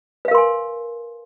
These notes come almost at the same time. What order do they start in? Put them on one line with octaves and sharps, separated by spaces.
B4 F5 A#4 C6 G#5